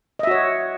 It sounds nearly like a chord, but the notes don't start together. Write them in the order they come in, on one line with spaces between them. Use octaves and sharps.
D#5 E5 F#4 C#5